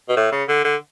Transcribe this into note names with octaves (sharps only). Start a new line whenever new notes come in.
B2
A2
C#3
D3
D3